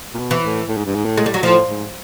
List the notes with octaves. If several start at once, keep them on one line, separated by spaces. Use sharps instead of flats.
A#2
B2
E3
A2
A2
G#2
G2
G#2
A2
G#3
G3
F#3
A2 F3
G#2